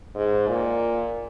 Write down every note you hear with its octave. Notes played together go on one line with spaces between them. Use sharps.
G#2
A#2